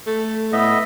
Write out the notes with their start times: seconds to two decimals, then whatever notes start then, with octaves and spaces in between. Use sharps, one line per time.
0.06 A3
0.52 A2 B3 D#5 E5